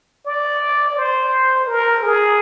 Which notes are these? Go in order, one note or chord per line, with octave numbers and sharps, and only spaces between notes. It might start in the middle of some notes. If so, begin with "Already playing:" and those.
D5
C5
A#4
G#4